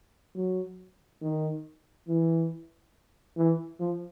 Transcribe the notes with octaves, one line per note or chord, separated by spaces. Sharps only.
F#3
D#3
E3
E3
F3